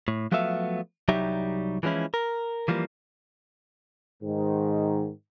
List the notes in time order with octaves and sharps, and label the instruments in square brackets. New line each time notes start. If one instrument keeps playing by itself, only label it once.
[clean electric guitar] A2
F3 F#3 A3 B3 E5 F5
C2 F#3 G3 D#4 G4 E5
E3 F3 G#3 C#4 E4
A#4
E3 F3 G3 A#3
[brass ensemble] G#2 D#3